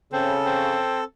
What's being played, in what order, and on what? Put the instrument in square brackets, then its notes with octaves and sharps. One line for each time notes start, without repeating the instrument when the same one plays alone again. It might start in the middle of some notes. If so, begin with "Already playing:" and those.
[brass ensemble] C#3 [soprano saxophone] C4 [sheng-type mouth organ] A4
[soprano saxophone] C4